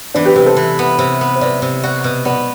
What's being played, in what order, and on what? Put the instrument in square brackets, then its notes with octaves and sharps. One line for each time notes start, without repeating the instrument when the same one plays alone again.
[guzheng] E3 [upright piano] B3 D4
[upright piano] G4 B4
[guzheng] C3 [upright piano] G4 B4
[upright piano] A4 C5
[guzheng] E3
B3
C3
B3
[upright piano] C5
[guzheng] C3 [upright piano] B4 D5
[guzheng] C3
[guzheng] F#4 [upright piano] D5 F#5
[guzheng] B2
[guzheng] B3 [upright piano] D5 F#5